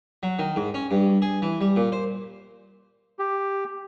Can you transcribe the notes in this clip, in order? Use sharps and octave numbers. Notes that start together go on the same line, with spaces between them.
F#3
D#3
G#2
C#4
G2
G#4
E3
G3
A#2
C5
G4